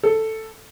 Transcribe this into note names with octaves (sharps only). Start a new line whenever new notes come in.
A4